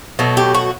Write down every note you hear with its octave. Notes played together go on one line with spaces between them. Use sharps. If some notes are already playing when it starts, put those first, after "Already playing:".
B2 F#3 A3
G4
F#4